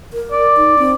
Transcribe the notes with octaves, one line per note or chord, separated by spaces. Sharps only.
A#4
D5
D#4
C4